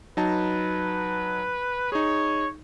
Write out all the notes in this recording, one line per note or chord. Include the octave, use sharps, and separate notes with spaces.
F#3 D#4 B4 A5
D#4 G#4 C#5